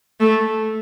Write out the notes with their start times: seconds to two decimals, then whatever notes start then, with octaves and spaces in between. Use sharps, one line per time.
0.20 A3